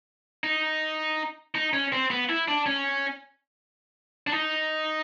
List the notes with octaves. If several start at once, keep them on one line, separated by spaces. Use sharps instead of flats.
D#4
D#4
C#4
C4
B3
E4
D4
C#4
D4
D#4